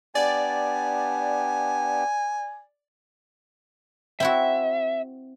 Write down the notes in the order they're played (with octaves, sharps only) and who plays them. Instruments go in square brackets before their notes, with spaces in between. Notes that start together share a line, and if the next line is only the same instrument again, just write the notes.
[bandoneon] B3 D4 G4 [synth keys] D5 [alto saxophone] G#5
[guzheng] C4 E4 F#4 [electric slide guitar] E5